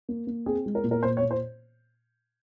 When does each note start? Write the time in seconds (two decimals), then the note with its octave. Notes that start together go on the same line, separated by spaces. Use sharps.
0.09 A#3
0.27 A#3
0.46 C4 G#4
0.66 G#3
0.75 A#4
0.84 A#2
0.91 A#4
1.03 A#2 C5
1.17 C#5
1.22 A#2
1.31 C5